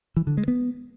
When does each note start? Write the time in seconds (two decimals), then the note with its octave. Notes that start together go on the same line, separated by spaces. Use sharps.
0.17 E3
0.27 D3
0.37 G#3
0.48 B3